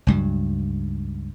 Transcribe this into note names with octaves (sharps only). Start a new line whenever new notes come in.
C#2 G2 F#3